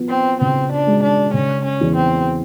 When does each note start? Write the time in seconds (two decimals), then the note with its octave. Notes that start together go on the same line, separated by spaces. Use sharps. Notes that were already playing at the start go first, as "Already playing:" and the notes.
Already playing: F3 B3
0.09 C4
0.40 C#3 C4
0.72 D4
0.87 G#3
1.03 D4
1.33 C#3 C#4
1.65 C#4
1.81 E2
1.96 C4